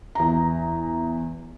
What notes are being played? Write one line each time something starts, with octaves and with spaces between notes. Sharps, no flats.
E2 A#5